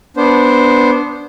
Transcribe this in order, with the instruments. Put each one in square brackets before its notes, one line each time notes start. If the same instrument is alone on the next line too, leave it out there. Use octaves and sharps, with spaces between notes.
[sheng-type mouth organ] B3 D4 C5